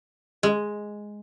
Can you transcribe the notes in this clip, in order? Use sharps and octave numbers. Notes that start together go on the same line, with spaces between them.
G#3